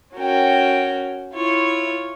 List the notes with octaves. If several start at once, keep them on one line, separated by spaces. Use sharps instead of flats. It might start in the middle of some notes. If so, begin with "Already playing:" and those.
C#4 F#4 A#4 G5
E4 F4 C#5